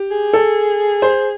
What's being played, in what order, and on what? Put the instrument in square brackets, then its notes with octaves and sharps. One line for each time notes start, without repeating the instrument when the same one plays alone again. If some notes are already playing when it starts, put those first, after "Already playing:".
Already playing: [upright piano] G4
[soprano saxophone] G#4
[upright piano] A4
C5